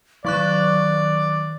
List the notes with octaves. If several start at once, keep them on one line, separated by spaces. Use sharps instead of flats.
D#3 F#3 D5 C#6 F#6